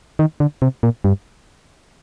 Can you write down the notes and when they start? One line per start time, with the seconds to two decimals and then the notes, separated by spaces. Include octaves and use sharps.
0.19 D#3
0.40 D3
0.62 C3
0.83 A#2
1.04 G2